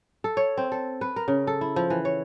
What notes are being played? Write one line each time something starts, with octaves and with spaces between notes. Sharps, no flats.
A4
C#5
C4
A4
B4
A#4
C#3
A4
E4
F3
E3
C#5